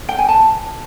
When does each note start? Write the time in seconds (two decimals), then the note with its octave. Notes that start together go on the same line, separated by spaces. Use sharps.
0.09 G5
0.19 G#5
0.29 A5